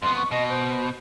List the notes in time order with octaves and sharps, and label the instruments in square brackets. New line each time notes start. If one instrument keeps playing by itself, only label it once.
[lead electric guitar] F2 B3 [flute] C6
[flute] C#6
[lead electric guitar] B2 [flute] D#5
[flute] C5